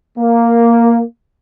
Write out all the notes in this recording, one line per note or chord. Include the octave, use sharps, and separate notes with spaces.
A#3